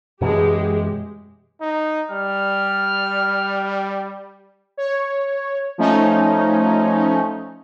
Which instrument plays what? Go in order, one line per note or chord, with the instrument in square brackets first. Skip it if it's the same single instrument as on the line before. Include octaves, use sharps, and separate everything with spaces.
[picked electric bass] F#2 B2 E3 [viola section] G#3 G4
[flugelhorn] D#4
[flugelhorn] G3 [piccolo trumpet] F6
[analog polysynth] C#5
F3 A3 C#4 D#4